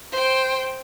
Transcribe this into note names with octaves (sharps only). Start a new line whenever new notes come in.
C5 G5